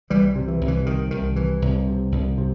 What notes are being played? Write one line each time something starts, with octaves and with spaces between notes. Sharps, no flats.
C2 E3 G3
C3
E3
C2
E3
C3 D#3
C2 D#3
C3 E3
C2
C3
C2
C3